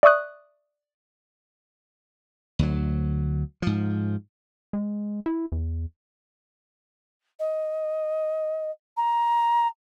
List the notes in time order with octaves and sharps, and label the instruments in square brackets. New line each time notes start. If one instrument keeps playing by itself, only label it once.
[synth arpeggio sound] D5 E5 C#6 D#6 F#6
[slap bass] D2 F#3
G#2 F3
[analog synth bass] G#3
E4
E2
[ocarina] D#5
A#5